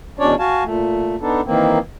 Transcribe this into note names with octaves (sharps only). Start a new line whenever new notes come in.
E2 B2 C#4 D4 C#5 D5
F#4 F5 G#5 A5
A#2 A3
B3 D4 D#4 A4
D#3 E3 A#3 C4